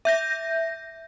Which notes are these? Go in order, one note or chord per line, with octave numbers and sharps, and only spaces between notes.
E5 G6 A#6